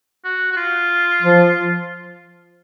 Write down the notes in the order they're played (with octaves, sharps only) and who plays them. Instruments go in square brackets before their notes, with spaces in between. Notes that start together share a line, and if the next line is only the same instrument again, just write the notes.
[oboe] F#4
F#4
F4
[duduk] F3